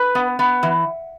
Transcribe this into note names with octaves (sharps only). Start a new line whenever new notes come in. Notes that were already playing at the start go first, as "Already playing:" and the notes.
Already playing: B4
B3
B3
E3